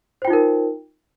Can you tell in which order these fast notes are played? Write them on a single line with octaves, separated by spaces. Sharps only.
C5 G5 F4 D#4 A#4